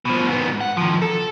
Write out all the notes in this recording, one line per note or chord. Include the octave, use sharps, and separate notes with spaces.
B2 F3
G#2 B3
F#5
D#3 F3
A4